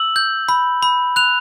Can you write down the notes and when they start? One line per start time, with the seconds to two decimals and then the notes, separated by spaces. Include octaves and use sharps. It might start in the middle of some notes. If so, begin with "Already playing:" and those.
Already playing: E6 F#7
0.16 G6
0.49 B5
0.82 B5
1.16 F#6 F7